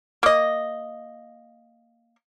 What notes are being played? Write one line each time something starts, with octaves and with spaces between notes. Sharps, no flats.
A#3 D#5